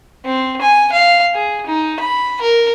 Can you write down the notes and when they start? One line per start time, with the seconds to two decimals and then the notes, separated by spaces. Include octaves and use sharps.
0.25 C4
0.62 G#5
0.92 F5
1.34 G#4
1.67 D#4
2.00 B5
2.41 A#4